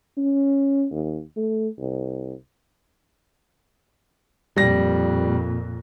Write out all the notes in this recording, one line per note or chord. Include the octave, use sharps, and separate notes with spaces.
C#4
D#2
A3
C2
F2 A#2 G3 A#6